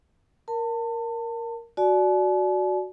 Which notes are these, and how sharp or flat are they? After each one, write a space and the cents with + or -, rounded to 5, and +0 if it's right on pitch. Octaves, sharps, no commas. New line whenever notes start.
A#4 +0 A5 +30
F#4 +0 D5 +0 A5 -45